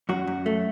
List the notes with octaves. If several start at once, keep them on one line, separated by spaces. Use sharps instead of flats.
F#2 F#4
F#2
A3